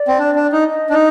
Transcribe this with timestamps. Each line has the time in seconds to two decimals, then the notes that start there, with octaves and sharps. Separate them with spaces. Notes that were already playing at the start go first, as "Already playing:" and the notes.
Already playing: D5
0.08 C4
0.19 D4
0.35 D4
0.52 D#4
0.69 D#5
0.90 D4
0.93 D#4